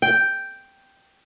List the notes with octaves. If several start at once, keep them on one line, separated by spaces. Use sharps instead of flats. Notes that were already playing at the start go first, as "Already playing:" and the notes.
G5